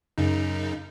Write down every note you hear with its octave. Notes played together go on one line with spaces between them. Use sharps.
F#2 C#3 D#4